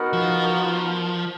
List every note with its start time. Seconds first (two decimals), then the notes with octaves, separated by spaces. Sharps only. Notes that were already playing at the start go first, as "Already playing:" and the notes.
Already playing: B3 D#4 F#4 A#4
0.13 F3